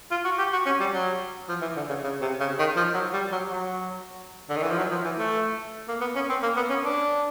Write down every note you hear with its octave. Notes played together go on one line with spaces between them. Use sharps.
F4
F#4
G4
F#4
C#4
G3
F#3
F3
E3
D3
C#3
C#3
C3
C#3
D#3
F3
F#3
G3
F#3
F#3
D3
D#3
E3
F3
F#3
F3
E3
A3
A#3
B3
C#4
C4
A#3
B3
C#4
D4